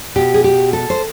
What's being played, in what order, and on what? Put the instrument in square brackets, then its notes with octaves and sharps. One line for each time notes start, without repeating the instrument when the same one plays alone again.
[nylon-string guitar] B2 G4
G#4
G4
A4
C5